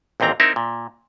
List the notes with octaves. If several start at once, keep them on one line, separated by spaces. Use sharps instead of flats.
A1 D#2 A#2 C4 A#5
C4 D#4 E4 A#4 E5
A#2